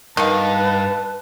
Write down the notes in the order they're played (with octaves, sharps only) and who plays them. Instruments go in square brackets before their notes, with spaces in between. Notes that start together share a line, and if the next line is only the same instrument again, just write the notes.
[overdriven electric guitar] G2 F5 [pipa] B2 D#3 [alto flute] B4 [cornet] A5